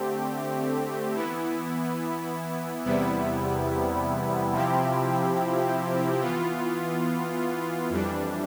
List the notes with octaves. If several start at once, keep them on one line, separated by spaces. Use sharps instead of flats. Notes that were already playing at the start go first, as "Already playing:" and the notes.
Already playing: D3 A3 C4 G4
E3 B3 E4
E2 C3 G3 B3 E4
C3 F3 C4 E4 G4
E3 B3 F4
F2 E3 G3 D4